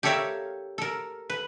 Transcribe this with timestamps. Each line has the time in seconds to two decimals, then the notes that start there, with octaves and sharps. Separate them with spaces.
0.03 G4 A4 A#4 C#5 E5 F5
0.78 A4 A#4
1.30 B4